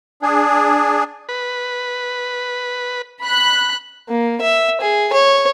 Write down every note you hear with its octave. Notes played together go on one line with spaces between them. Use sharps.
D4 G#4
B4
B5 F#6
A#3
E5
G#4
C#5